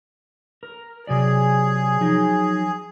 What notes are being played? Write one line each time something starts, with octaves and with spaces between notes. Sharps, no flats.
A#4
C3 F#3 G#4 D5
F3 F#3 D#4